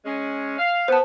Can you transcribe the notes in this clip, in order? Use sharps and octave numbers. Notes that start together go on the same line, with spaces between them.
G#3 C#4
F5
B3 C5 A5